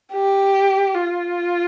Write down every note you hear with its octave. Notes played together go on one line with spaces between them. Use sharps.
G4
F4